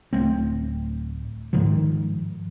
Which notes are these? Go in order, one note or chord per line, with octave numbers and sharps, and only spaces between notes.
D1 D#2 A3 C4
G#2 D#3 F3